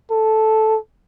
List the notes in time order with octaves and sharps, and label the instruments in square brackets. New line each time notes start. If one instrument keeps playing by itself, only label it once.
[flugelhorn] A4